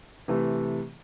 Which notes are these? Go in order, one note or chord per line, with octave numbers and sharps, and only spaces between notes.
C3 E3 A3